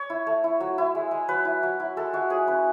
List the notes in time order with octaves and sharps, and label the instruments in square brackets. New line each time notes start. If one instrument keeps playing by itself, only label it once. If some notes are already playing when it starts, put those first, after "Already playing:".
Already playing: [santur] C#5
E4
A3
E4
F#3
E4
G#3
G#3
F#3 B4
E4
F#3
E4
G#3 A4
G#3 F#4
F#3 G#4
C#4 B4